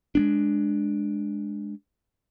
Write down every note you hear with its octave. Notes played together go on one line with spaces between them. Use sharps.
G#3 B3 D4